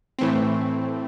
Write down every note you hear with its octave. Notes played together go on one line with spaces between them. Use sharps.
A2 E3 A3 C4